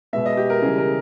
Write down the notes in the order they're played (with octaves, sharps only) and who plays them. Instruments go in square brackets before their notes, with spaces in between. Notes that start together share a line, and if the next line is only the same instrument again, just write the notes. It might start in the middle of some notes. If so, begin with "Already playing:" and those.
[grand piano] B2 G#3 B3 [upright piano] E5
[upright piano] D#5
G4
A#4
[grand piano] C#3 E3 G3 [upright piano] G#4
[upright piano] A#4